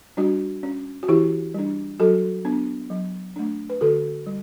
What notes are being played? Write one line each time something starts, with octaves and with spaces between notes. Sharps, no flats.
G3 D4 F#4
C#4
F#4
E3 E4 G4
G3 D4
F#3 F#4 A4
B3 D4
F#3
A3 D4
B4
D3 F#4 A4
G3